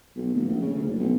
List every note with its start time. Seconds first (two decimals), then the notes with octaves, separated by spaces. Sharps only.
0.16 B1
0.34 D1
0.48 A#1
0.62 C#3
0.74 D2
0.87 F#1
0.99 B1